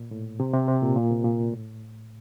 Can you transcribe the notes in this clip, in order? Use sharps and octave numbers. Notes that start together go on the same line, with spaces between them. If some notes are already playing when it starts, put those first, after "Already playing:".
Already playing: A#2
A2
C3
C3
C3
A#2
A#2
C3
A#2
A2